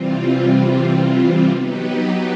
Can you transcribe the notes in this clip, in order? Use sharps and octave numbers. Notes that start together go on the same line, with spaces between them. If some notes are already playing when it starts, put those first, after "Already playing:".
Already playing: C3 E3 G3 C4 F4
F#3 B3 D#4 G4 B4